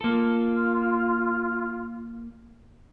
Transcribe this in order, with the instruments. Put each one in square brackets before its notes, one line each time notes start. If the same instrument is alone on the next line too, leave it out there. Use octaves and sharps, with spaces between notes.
[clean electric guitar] A#3 A4 [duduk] F4